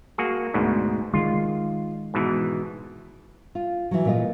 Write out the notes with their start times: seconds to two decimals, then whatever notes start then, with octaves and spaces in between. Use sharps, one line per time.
0.18 A#3 F#4 G#4
0.54 D2 G#2 B2
1.14 D#3 G#3 F4
2.14 G#2 B2 E3
3.55 F4
3.91 E3 F#3
4.05 A#2 F4 D#5